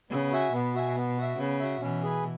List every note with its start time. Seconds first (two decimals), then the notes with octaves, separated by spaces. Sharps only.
0.10 C#3 B3
0.31 F#4 E5 G#5
0.53 B2 B3
0.75 F#4 E5 G#5
0.96 B3
1.17 F#4 E5
1.38 C#3 B3
1.60 F#4 E5
1.81 B2 E3 C#4
2.03 G#4 B4 G#5